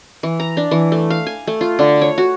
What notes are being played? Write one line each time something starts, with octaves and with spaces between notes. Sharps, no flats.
E3
A#5
D4
E3
A3
F5
G#5
A3
F4
D3
C#5
F#4